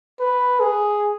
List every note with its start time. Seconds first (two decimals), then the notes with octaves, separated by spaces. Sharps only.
0.20 B4
0.60 G#4